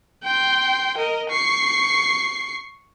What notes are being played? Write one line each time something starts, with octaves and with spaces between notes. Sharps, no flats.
G5 C6
A#4 D#5
C#6 C7